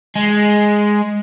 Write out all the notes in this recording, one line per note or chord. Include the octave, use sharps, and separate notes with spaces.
G#3